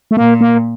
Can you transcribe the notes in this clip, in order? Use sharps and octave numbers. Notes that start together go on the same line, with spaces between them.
A3
A#2 A#3
A#3